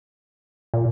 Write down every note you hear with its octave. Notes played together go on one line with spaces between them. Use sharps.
A#2